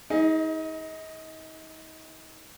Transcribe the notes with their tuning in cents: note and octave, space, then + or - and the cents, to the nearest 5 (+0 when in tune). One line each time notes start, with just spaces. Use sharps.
D#4 +35 G#4 +0 D#5 +0